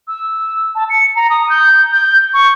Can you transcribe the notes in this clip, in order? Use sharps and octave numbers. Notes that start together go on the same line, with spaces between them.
E6
A5
C#7
A#5
D#6
G6
G6
C#6